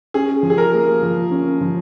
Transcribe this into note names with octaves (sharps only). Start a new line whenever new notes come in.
C#4 G#4
F3
G#4
A#4
A#3
F3
C#4
F3